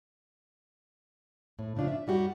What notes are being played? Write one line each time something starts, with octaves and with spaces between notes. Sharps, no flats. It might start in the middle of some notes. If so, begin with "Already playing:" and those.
A2
A2 C#3 F3 D4 F4
E5
F#2 G3 F#4 G4